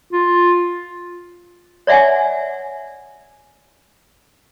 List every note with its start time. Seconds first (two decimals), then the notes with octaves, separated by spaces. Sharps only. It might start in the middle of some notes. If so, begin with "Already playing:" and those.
0.13 F4
1.87 C#5 D5 E5 F#5 G#5